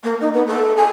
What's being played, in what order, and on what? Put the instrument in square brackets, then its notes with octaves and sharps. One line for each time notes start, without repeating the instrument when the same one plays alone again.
[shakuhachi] A#3
D#4
B3
A4
G#5